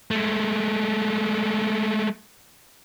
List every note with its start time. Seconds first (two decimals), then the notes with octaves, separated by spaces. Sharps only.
0.11 G#3 A3